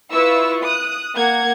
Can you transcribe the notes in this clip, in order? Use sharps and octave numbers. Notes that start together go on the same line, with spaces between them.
E4 F4 B4 C#6 E6
D#6 F#6
A#3 F#5 G#6